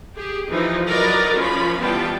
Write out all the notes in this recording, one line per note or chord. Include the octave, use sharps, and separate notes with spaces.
G4 G#4
E3 F3 D#4
F#3 A#4 B4 D5 D#5
F3 C#4 F4 B5
E3 G3 B3 F4 G5 A5